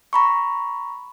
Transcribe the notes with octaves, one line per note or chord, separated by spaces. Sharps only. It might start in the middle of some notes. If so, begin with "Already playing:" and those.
A#5 B5 C#6